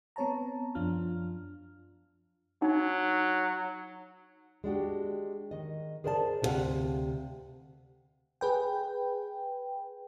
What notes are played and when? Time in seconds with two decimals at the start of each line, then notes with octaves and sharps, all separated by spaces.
0.16 B3 C4 C#5 A5 A#5
0.75 F#2 F3 D4 F4 F6
2.62 F#3 D#4
4.64 G#3 D4 F#4 G4
5.51 D#3 D#5
6.04 G#4 A#4 C5 D5 F#5 A5
6.42 D2 C3 E4 A4 F5 F#5
8.41 G#4 B4 G5